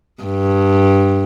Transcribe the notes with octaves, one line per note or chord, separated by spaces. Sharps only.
G2